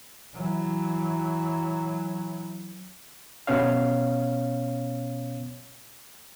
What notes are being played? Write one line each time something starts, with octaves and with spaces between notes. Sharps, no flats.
E3 F#3
B2 B3 C#4 C#5 F5